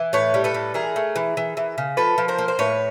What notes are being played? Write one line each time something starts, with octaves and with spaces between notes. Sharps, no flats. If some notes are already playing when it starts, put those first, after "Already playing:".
Already playing: E3
A2 B4 C#5
G3
A4 B4
A2
E3 G#4 A#4
A3
E3
E3
E3
C#3
F3 A4 B4
F3
A#4 C5
A#3
C5
A2 B4 C#5